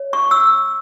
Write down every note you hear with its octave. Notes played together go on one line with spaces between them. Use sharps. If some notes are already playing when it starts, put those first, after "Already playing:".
Already playing: C#5
C#6
E6